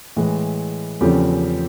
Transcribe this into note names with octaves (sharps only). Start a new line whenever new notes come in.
A2 E3 G#3
E2 C#3 F3 A3 C4 G4